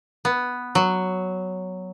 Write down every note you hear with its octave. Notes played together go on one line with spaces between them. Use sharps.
B3
F#3